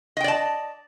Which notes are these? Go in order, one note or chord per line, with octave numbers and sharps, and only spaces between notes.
D5 D#5 G5 A5